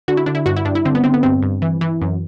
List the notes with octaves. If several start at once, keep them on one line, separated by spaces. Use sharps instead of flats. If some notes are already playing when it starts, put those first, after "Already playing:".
D3 F#4
E4
D3 D4
E4
G2 F#4
E4
G2 D4
E4
D3 C4
B3
D3 C4
B3
G2 C4
G2
E3
E3
F#2